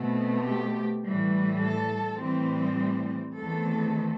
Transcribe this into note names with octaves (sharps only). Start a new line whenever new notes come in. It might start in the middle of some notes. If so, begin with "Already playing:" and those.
Already playing: B2 A3 C4
G4
A2 E3 G3
A4
A2 E3 G3 C4
E2 D#3 A3 C4 A4